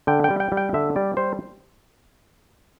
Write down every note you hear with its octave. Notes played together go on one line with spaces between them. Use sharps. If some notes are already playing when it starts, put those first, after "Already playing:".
D3 G5
G5
G3
G5
G3
G5
D3 E5
G3 D5
G3 C5